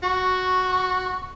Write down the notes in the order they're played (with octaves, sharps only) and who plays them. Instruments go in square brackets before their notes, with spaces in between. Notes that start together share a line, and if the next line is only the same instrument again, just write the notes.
[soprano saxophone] F#4 [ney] C#6